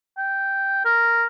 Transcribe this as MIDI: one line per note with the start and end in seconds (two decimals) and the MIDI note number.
0.17 0.81 79
0.85 1.25 70